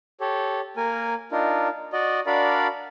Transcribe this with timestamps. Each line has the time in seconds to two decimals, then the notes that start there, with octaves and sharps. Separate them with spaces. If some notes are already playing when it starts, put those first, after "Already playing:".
0.20 G4 A4 C#5
0.77 A#3 A#4 G#5
1.32 D4 D#4 F4 A#4
1.93 F#4 D5 D#5
2.27 D4 F#4 A#4 D5 F5 B5